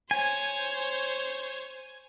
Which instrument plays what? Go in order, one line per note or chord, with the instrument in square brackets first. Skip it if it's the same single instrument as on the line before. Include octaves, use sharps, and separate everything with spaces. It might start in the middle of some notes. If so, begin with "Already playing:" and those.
[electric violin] C5 C#5 [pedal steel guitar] G#5